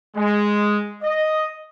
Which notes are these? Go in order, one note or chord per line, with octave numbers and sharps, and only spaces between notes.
G#3
D#5